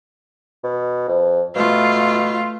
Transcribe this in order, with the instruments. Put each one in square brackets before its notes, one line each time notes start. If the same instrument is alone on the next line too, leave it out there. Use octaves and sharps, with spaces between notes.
[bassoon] B2
F2
[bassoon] B2 [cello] A3 F4